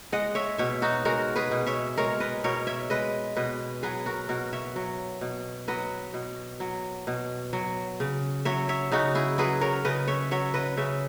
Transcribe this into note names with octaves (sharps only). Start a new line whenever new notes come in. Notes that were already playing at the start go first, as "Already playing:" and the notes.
G#3 D#5 F#5
C#5 E5
B2 C#5 E5
D#4 F#4
G#3 F#4 A#4
G#4 B4
B2
C#5 E5
G#3 A#4 C#5
B4 D#5
B2 A#4 C#5
C#5 E5
G#3 B4 D#5
B2 B4 D#5
F#3 G#4 B4
F#4 A#4
B2 F#4 A#4
C#5 E5
F#3
B2
F#3 B4 D#5
B2
F#3
B2
F#3
C#3
F#3 C#5 E5
C#5 E5
C#3 D#4 F#4
E4 G#4
F#3 G#4 B4
A#4 C#5
C#3 B4 D#5
C#5 E5
F#3 C#5 E5
B4 D#5
C#3 C#5 E5